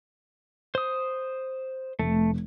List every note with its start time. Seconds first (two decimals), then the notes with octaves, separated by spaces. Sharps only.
0.75 C5 D#6
1.99 F1 A3